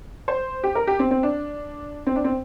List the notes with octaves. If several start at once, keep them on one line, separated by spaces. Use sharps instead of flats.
C5
G4
A#4
G4
C4
C4
D4
C4
D4
C4